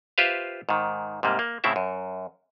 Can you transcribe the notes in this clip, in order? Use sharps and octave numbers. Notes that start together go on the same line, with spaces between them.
F4 G4 B4 C5 E5 F5
G#2 D#3
G#2 C3 G3 A#3
A#3
A2 C#3 C4 E4 E5
F#2